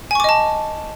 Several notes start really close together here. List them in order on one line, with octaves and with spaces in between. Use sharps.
G#5 C#6 D6 D#5 A5